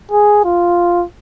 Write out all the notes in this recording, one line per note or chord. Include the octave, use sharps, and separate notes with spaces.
G#4
F4